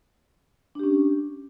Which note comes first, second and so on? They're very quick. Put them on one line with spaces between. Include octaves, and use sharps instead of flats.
D4 G4 C#4